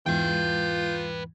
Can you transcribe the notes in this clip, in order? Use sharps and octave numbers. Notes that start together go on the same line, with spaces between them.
E2 G#2 E3 F4 B4 G5 G6